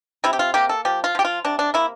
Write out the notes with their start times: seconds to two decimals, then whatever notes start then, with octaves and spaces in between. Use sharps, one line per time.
0.24 C3 E4
0.33 G4
0.39 F4
0.54 A#3 G4
0.69 A4
0.85 F3 G4
1.04 F4
1.15 F3 G4
1.25 F4
1.44 C3 D4
1.59 D4
1.74 A#3 E4